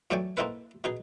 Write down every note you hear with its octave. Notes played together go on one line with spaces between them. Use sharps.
E2 F#3 A3 D5 G5 G#5
A#3 C4 D#4 E4 A4 B4
B2 D#4 G#4